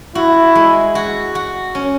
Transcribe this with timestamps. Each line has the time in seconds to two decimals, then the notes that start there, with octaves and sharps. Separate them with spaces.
0.15 E4 F#4
0.55 G#3
0.95 F#4
1.35 F#4
1.75 C#4